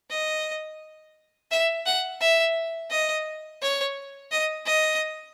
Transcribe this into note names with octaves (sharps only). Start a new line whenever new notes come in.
D#5
E5
F#5
E5
D#5
C#5
D#5
D#5